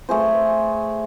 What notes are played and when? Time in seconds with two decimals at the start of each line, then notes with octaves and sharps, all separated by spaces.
0.09 A3 G#4 C5